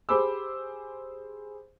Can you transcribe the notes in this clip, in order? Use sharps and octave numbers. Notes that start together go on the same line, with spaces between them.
G4 G#4 C5 B5 D6 E6